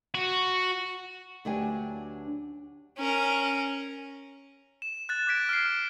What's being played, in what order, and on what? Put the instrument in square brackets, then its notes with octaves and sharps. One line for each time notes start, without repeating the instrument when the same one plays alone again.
[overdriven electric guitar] F#4
[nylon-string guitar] D2 F#3 D4 G4 B4 G#5
[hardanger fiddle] C#4 A#4
[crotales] E7
F#6 A6
D6 G#6 B6 D7
F6 C7